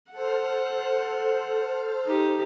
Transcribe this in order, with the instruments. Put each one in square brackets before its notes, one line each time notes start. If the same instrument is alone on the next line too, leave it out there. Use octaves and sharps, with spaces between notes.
[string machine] A4 C5 F6 [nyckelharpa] F#5
[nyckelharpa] D#4 G4